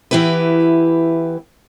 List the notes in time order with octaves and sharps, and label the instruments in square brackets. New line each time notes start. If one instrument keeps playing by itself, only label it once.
[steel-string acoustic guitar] E3 B3 E4 G4 B4